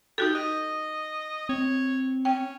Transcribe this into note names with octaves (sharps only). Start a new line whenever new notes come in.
D#4 F#4 G4 A4
D#5
C4 C#5
C#4 G5